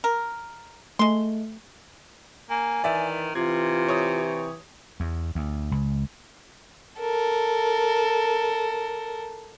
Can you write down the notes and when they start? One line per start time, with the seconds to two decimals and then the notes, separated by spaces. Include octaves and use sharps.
0.04 A#4
0.99 G#3 A3 C6
2.50 A#3 G#5
2.84 D#3 E3 D5 E5
3.35 C3 E3 F4 G#6
3.87 G4 C#5 D#6
5.00 E2
5.35 D2
5.72 C#2
7.00 A4 A#4